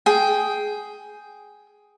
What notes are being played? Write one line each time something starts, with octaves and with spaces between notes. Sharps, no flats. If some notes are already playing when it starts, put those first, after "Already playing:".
G#4 G5